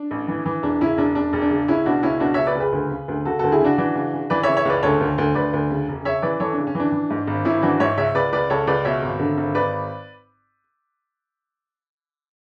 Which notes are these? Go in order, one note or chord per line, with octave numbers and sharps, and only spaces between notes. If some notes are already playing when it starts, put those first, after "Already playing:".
Already playing: D4
A1
E3
E3
E1 D4
C#3 C#4 E4
E1 D4
E1 D4
E1
D4
C#3
C#2 C#4 E4
B2 D4 F#4
C#2 C#4 E4
B2 D4 F#4
C#2 C#5 E5
B4 D5
C#2
G#4 B4
D2
C#3
D2
C#3 F#4 A4
D2 F#4 A4
E4 G#4
C#3 D4 F#4
E3 D4 F#4
C#3
C#3
E3 B4 D5
C#3 C#5 E5
C#5 E5
C#2 B4 D5
D2 A4 C#5
D2
D2
D2 B4 D5
D2
C#3
E1
C#3 C#5 E5
E3 B4 D5
E3 A4 C#5
D4
C#3
C#4
E3 D4
E3
G#2
G#1
G#1 C#4 E4
E3 D4 F#4
G#2 C#5 E5
C#2 C#5 E5
C#2 B4 D5
C#2 B4 D5
C#2 A4 C#5
C#2 B4 D5
B2 C#5 E5
G#1
D3
G#1
G#1 B4 D5